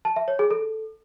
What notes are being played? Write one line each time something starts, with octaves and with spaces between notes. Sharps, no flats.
A5
E5
C#5
G#4
A4